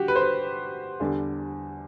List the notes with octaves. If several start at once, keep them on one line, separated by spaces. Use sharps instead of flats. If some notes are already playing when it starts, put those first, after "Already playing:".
Already playing: D3 G3 F#4 G4
B4
C5
B4
E2 D3 G3 D4